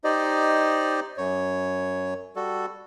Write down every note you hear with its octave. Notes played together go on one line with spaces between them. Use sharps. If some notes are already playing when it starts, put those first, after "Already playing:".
D#4 G4 C5 D5 D#5
F#2 C#5
G3 F#4 A4